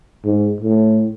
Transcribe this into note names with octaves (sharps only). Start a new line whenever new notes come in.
G#2
A2